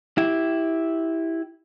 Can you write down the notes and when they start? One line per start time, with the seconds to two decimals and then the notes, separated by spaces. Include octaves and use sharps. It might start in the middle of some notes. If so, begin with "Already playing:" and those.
0.18 E4 G4